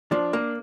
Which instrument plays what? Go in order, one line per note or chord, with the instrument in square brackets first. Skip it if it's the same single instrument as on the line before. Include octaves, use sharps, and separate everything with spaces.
[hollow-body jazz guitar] F3 [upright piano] D4
[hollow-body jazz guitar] A#3